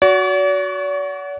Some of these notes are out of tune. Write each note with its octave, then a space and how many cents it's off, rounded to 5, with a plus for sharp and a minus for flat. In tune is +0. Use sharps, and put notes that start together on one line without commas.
F#4 +0 D5 -45